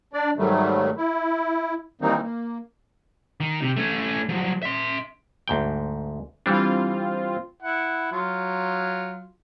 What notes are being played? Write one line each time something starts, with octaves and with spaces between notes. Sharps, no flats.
D4 D5
G#2 D#3 F#3 G3 A3
E4
D#3 E3 G3 A#3 C4 D#4
A#3
D#3
C3
A3 C#4
F3 F#3
E5 C6
D2 G#2 G5
E3 G3 C4 D4 F4
E4 F#5
F#3 F4